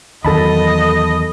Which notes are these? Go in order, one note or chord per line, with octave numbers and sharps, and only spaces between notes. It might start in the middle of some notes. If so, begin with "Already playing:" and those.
E2 D#3 F#3 A4 D#5 A5 B5